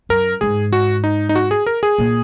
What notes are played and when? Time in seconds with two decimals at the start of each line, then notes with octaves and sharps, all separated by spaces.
0.09 F#2 A#4
0.41 G#2 G#4
0.73 F#4
1.04 D#4
1.29 D#4
1.35 F#4
1.51 G#4
1.66 A#4
1.83 G#4
1.98 A#2